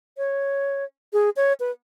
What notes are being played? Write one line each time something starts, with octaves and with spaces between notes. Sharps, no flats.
C#5
G#4
C#5
B4